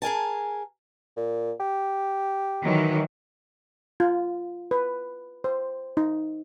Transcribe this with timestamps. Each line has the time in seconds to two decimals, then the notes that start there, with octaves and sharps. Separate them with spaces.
0.02 G#4 A#4 G#5 A5
1.17 A#2
1.60 G4
2.62 D#3 E3 F#3
4.00 F4
4.71 B4
5.44 C5
5.97 D#4